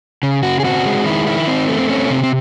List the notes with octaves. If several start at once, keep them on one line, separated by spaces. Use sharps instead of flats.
C#3
C#3 F#4
G#4
C4 F#4
G#3
D#3 E4
D#3 E4
C4 D#4
A3
C4
C4 C#4
C3 C4
C4